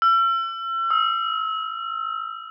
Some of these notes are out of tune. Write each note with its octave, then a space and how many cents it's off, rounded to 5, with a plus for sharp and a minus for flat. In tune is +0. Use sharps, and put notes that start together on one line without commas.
E6 +40
E6 -30